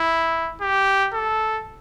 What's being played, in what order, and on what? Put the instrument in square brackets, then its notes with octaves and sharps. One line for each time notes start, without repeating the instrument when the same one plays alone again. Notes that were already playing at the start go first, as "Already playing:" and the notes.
Already playing: [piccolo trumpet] E4
G4
A4